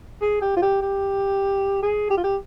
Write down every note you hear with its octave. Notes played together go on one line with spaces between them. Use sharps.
G#4
G4
F4
G4
G4
G#4
G4
F4
G4